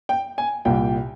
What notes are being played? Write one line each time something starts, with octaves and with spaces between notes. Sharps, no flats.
G5
G#5
C2 A#2 G5